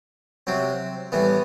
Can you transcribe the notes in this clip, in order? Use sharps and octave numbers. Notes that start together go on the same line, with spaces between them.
C3 F#3 C4
A2 E3 G3 B3